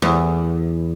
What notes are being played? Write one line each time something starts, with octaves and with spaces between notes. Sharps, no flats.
E2